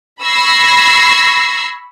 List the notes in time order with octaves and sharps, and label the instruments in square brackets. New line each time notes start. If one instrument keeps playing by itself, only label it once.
[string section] B5 C#6 E6 G#6 A#6 C7